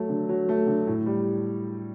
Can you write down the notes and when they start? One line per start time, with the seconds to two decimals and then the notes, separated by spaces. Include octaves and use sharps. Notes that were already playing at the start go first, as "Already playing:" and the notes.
Already playing: F#3 A3
0.09 D3
0.29 F#3
0.49 A3
0.67 D3
0.87 A2
1.06 G3